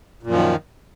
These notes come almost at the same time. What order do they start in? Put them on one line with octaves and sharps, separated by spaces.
A#2 F#2 F3 D#3